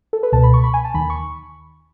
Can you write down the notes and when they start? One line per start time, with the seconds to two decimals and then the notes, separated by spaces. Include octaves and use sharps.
0.13 A4
0.23 B4
0.32 C#2 B2 A5
0.43 B5
0.54 C#6
0.63 B5
0.74 G#5
0.84 A5
0.94 D#2 D#3 B5
1.10 C#6